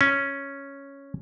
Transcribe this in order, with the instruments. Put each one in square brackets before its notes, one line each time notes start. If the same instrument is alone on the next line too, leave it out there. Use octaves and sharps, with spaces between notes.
[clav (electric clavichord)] C#4